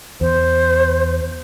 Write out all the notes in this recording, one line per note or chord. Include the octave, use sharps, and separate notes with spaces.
E2 C5